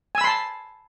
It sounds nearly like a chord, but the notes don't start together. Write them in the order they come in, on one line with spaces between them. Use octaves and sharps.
G#5 E6 B5 C6 A5